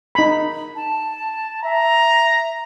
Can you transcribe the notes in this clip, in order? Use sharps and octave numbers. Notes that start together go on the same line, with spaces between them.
D#4 B5
A5
E5 A#5